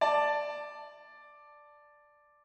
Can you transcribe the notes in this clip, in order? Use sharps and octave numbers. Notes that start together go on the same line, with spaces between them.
D5 A5